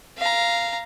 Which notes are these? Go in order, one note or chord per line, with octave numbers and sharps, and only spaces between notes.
F5 A#5